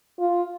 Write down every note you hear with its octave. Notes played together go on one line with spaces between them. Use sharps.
F4